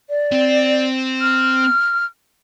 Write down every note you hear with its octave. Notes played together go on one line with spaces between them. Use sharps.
D5
C4
F6